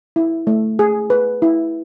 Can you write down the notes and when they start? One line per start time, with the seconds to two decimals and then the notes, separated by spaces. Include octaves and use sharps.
0.16 E4
0.47 A3
0.79 G#4
1.10 B4
1.42 E4